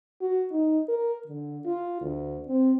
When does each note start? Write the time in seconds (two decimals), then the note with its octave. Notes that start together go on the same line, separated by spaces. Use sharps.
0.21 F#4
0.51 D#4
0.88 A#4
1.27 D3
1.65 F4
2.01 D2
2.48 C4